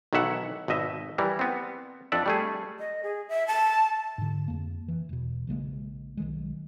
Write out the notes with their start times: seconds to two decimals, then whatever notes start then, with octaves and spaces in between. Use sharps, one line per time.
0.13 B1 D#3 E3 E5 F#5
0.68 G#1 B2 D#5 E5
1.18 E3 G3 A#4
1.39 B3 C4
2.12 F2 D4 A4 D5 E5
2.26 G3 A3 G#4
2.79 D#5
3.03 G#4
3.29 E5
3.48 A5
4.18 G#2 D3
4.48 F2 A#3
4.88 E3
5.09 E1 B2
5.47 A#1 C#3 G#3 A#3
6.17 B1 D#3 G#3